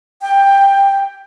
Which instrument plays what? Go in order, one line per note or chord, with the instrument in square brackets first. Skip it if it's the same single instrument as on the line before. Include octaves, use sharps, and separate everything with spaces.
[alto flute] G5